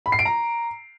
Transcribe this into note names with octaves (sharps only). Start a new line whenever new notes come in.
B5
C7
D7
A#5